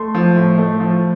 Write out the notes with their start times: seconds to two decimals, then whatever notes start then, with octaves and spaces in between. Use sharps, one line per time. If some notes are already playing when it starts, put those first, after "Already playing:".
Already playing: A3 C6
0.15 F3
0.36 A2
0.58 A3
0.80 F3